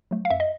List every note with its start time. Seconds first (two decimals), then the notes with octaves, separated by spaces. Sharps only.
0.11 F#3 A3
0.25 F5
0.30 F#2 E5
0.40 D#5